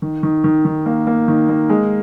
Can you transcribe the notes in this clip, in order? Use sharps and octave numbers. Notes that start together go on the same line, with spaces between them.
D#3
D#3
D#3
D#3
A#3
A#3
D#3
A#3
G#3